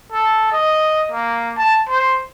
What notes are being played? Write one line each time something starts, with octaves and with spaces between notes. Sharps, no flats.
A4
D#5
A#3
A5
C5